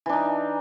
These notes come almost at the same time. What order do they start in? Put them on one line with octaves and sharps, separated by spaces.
E3 D4 D#4